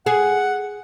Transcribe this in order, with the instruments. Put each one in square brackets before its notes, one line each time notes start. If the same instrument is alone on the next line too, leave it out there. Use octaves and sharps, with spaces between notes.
[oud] G#4 [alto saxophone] F#5